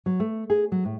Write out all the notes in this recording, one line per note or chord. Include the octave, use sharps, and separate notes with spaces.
F#3
A3
G#4
F#3
A2